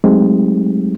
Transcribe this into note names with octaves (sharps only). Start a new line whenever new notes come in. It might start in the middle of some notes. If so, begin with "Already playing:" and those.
F#3 G#3 A3 C4 D#4 G4